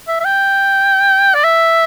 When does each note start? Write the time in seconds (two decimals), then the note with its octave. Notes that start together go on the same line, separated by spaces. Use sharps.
0.08 E5
0.20 E5
0.25 G5
1.35 D5
1.45 E5